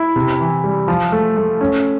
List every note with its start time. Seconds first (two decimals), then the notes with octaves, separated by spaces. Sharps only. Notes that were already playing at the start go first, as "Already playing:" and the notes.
Already playing: E4
0.16 C3
0.41 E3
0.64 G3
0.88 F3
1.12 A3
1.37 A3
1.61 C#4